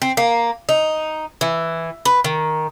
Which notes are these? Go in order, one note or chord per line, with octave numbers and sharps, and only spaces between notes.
C4
A#3
D#4
E3
B4
D#3